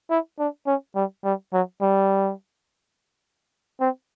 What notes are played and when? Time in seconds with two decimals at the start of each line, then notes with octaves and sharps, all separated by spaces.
0.10 E4
0.39 D4
0.67 C#4
0.96 G3
1.25 G3
1.53 F#3
1.81 G3
3.81 C4